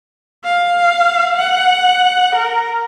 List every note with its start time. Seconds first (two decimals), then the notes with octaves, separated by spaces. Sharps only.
0.44 F5
1.37 F#5
2.35 A#4